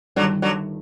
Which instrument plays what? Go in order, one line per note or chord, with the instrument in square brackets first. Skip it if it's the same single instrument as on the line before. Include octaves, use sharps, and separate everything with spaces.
[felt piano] G1 G2 D#3 [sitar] D3 F#3
[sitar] D3 F#3